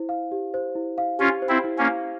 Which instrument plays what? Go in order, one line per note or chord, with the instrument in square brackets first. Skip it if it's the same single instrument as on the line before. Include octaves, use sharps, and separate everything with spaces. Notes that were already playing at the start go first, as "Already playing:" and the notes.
Already playing: [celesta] E4 C5
F5
G4
C5
E4
F5
[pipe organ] C#4 F4 [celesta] G4
[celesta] C5
[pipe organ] C4 E4
[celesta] E4
[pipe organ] A#3 C#4
[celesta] F5